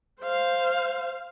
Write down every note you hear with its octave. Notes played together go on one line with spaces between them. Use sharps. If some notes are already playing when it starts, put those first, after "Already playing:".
C5 F5